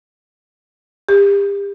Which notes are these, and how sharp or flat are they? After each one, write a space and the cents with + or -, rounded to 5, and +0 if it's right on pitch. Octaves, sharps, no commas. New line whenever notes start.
G4 +35